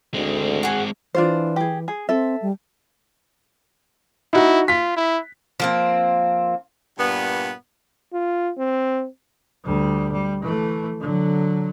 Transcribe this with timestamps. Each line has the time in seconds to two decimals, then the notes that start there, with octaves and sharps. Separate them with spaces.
0.14 D2 G#3 C4
0.63 F#4 G#4
1.15 E3 D4 F4 C5
1.56 G4 G#4
1.88 G#4
2.09 C4 A4 E5
2.42 G3
4.33 D#4 E4 F#4
4.68 F4 B6
4.96 E4
5.60 F3 A#3 C4
6.99 G2 A#2 B3
8.13 F4
8.58 C4
9.65 D2 G3
10.12 G3
10.43 E3 A3
11.00 D3 F#3